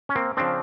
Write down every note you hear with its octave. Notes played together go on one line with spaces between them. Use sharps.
C#4
A#3 C4
C#3 F3 C4 D4